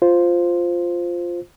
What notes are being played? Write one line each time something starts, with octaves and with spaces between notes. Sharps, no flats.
F4 C5